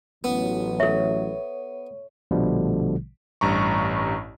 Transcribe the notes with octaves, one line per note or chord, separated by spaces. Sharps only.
A1 F#3 B3
A4 C#5 E5
A#1 B2 D3 F3 G3 A3
A1 G2 A#5 C#6